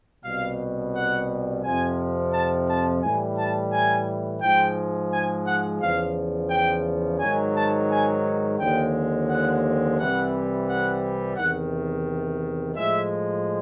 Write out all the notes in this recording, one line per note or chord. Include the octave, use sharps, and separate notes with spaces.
C2 B2 G3 F5
F#5
F2 C3 F3 G#5
A5
A5
A2 E3 G3 G#5
A5
G#5
G#2 F3 G#3 G5
G#5
F#5
E2 C#3 F3 F5
G5
G#2 D#3 F#3 G#5
A5
G#5
D#2 D3 F3 G#3 G5
F#5
C2 C3 E3 G3 F#5
F#5
E2 C3 D#3 F#5
A2 F3 G#3 E5